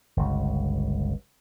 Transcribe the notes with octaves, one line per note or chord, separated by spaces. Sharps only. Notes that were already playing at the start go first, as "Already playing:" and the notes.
G1 C#2